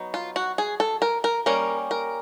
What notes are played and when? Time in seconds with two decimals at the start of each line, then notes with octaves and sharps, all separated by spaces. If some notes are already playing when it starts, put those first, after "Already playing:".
Already playing: F#3 B3 D#4
0.14 F4
0.36 F#4
0.58 G#4
0.80 A4
1.02 A#4
1.24 A#4
1.46 G3 A#3 C#4 A#4
1.91 A#4